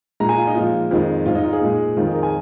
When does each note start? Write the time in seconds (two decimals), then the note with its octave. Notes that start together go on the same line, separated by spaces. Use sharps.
0.20 A#2 G#3 A#5
0.29 G#5
0.37 F4
0.47 D#4
0.55 A#2 F3 G#3 F4
0.91 F2 D#3 G#3
1.26 G#2 G#3 F4
1.35 D#4
1.44 F4
1.53 G#4
1.61 A#2 G#3
1.96 F2 D#3 G#3 F4
2.06 G#4
2.14 A#4
2.23 G#5